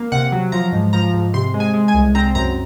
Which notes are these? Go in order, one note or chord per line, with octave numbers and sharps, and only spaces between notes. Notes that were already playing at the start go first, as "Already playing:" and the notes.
Already playing: A#3
C3 F#5
F#3
F3 A#5
G#2
F3 A#5
G#2
C3 C6
G#3
G#5
G#3
G#5
C2
C4 A#5
F#2 A#5